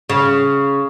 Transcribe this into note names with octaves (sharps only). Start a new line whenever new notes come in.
C#3